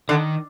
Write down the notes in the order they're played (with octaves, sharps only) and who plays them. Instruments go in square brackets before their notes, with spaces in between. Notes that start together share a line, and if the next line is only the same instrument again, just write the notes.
[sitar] D3 [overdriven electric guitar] D#3